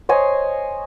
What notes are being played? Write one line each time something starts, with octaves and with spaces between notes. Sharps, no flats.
C5 C#5 D#5 G#5